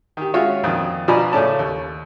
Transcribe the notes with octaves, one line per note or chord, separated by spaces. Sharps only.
D#3 G4
G#3 C#4 F4 F#4 C#5 E5
F2 A#2 D#3
B2 F3 D5 G#5 A#5 B5
A2 C#3 A3 C#4 D5 A5
D#2